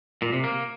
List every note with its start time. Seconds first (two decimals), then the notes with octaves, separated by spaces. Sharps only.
0.22 A#2
0.33 C3
0.44 A#3